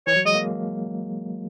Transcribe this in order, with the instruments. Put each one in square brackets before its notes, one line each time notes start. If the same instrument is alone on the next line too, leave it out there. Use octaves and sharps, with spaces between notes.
[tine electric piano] E3 [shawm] C#5
[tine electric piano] F#3
[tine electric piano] G#3 [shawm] D#5
[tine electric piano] A#3